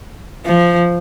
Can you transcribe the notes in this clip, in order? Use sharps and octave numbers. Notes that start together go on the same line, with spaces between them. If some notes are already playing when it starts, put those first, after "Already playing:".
F3